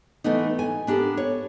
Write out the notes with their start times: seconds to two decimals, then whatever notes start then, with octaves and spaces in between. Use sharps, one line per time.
0.24 E3 A3 B3 D#4
0.59 G#5
0.87 B3 D4 G4 A4 A#4
1.17 C#5